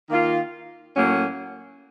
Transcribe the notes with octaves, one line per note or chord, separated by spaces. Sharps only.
D#3 A#3 F4
A2 F#3 A#3 C#4